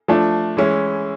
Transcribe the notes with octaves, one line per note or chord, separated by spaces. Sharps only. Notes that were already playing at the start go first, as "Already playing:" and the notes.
F3 A3 D4
E3 G#3 C#4 E4